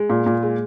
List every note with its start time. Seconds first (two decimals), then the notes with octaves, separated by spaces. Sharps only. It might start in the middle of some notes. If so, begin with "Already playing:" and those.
Already playing: G#3
0.09 A#2
0.26 A#2
0.43 G#3